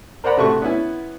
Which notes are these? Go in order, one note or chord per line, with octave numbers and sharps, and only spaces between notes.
A#4 C5 D5 F#5 A#5 B5
A2 C3 A3 F#4 C#6
B3 C#4 E4 G#5